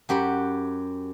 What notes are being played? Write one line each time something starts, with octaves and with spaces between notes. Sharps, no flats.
F#2 G4 F#5 B5